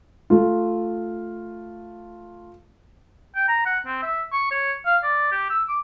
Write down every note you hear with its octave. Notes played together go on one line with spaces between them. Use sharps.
A3 F4
G5
A#5
F#5
C4
E5
C#6
C#5
F5
D5
G4
E6
D6